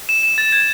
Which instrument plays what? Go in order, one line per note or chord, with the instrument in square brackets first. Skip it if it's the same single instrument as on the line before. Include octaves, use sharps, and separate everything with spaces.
[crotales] E7
E7
A6
G#6